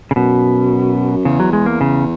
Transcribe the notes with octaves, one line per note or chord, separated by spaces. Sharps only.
C#3
F#2 B2
E2 C#3
F#3
G#3
A#3
C#3